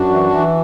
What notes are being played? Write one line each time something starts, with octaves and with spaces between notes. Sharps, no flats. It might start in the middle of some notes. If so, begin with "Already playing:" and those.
Already playing: F#2 D4 F#4
E3
E3